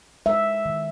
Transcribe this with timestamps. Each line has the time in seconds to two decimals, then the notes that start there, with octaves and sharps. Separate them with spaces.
0.26 G#3 E5
0.65 D#3